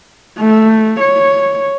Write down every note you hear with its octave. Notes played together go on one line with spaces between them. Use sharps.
A3
C#5